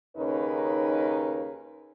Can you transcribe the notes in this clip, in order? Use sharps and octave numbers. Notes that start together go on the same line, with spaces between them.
D#2 C#3 C#4 D#4 A#4 B4